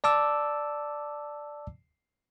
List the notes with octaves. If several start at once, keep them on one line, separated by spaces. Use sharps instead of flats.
D5 A5 D6 E6